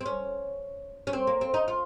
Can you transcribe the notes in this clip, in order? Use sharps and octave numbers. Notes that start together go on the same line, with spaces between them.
C4
C#4
C#4
C4
A#3
C4
D#4
F4